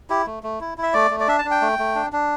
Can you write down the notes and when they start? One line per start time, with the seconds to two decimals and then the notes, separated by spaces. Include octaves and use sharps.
0.10 E4 G4
0.26 A3
0.43 A3
0.61 E4
0.78 E4
0.83 E5
0.94 A3 D5
1.11 A3
1.20 D5
1.28 D4 E5
1.39 A5
1.45 D4
1.51 G5
1.62 A3
1.79 A3
1.95 D4
2.13 D4